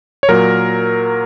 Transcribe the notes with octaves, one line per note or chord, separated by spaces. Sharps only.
C#5
A#2 F#3 A#4